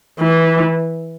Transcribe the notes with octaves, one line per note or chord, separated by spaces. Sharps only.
E3